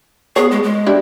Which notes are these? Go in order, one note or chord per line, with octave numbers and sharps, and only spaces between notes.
B3 G#4 C#5
G#3
G#3
D4 E4 G4